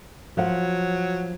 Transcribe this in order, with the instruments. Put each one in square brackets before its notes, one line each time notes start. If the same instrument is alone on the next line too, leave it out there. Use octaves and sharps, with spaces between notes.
[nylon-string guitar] F3 F#5 [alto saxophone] F#3